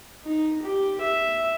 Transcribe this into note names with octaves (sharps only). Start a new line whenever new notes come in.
D#4
G4
E5